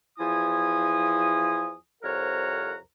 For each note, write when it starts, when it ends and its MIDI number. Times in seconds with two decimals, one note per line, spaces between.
0.18 1.73 40
0.18 1.73 53
0.18 1.73 64
0.18 1.73 80
0.18 1.73 87
2.03 2.76 36
2.03 2.76 41
2.03 2.76 70
2.03 2.76 73
2.03 2.76 78
2.03 2.76 82